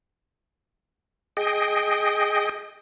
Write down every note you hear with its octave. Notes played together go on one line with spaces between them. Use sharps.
G#4 D#5 G5